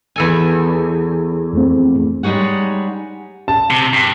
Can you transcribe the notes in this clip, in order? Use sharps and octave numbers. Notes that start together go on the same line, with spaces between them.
E2 A4 G#5
F2 A3 C4
G3 G#3 D#4 C#5 F#5
A5
C3
G2